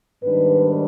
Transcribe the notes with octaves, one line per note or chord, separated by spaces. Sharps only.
G#2 D#3 G3 B3 D4 B4